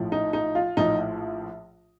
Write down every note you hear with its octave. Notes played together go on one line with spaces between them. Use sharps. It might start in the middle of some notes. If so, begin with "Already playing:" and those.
Already playing: A#1 A2 F3
D#4
D#4
F4
A#1 A2 F3 D#4